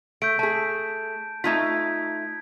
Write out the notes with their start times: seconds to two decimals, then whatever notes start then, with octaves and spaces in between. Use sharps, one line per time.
0.22 A3 G6 D7
0.39 A3 G#4 A5
1.44 A3 D#4 F4 G#6 B6